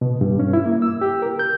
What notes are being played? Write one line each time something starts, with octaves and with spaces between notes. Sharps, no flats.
B2
G2
C#4
E4
A#3
E6
G4
A#4
G6